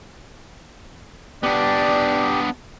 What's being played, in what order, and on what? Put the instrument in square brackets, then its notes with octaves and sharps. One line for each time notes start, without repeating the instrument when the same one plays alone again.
[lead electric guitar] B3 D4 [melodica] G4 [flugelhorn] D5